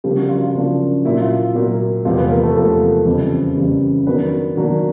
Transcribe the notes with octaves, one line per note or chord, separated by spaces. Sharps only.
C#3 F3 G3 A#3 D4 G4
F#3 F#4
F4
F4
C#3 F3 A#3 D4
A#2 F#3 A#3 E4
F4
A#2 F#3 A#3
E2 C3 F3 G#3 F4
B3 B4
A#3 A#4
A3 A4
E2 C3 F3 G#3 A#3 A#4
F2 C#3 E3 G3
F2 C#3 E3 G3
D#3 F#3 A#3 B3 D4 B4
D#3 F#3 A#3 D4